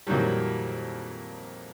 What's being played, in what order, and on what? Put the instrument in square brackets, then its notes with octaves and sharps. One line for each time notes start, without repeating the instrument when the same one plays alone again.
[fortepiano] F2 A#2 D#3 E3 F#3 G3